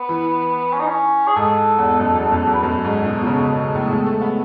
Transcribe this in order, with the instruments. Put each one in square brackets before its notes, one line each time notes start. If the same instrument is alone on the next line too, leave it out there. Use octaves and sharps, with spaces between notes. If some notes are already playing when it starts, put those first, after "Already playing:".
Already playing: [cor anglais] B3
[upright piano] E3
[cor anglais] C#4
D#4
C#4
G#4
[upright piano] G#2 [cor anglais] A4
[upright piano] E2
F#2
E2
F#2
E2
[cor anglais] B4
[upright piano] F#2 [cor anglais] A4
[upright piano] G#2
B2
B2
C#3
C#3
A2
G#3
A3
B3